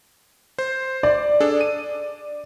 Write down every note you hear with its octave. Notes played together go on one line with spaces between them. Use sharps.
C5
D5
D4 G#4 A4
D#7